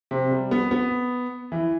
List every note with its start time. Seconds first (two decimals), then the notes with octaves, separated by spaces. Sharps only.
0.11 C3
0.31 G3
0.51 B3
0.71 B3
1.52 E3